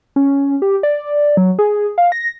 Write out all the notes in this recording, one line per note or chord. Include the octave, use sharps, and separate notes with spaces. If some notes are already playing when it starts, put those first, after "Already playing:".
C#4
G4
D5
F#3
G#4
F5
A#6